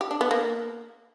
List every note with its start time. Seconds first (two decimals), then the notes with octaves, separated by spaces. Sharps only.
0.01 G4
0.11 D4
0.21 B3
0.31 A#3